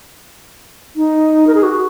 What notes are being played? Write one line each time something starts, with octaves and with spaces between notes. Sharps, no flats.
D#4
A#4
G#4
F#4